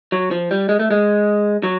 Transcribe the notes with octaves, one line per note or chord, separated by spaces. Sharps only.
F#3
F3
G3
G#3
A3
G#3
F#3